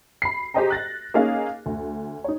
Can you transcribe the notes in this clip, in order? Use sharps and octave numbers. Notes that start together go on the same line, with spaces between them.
B5 C7
G4 G#4 C5 D#5 G5 A#5
F#6 A6 A#6
A#3 C#4 D#4 G#4 D#5 F5
D2
D#4 C#5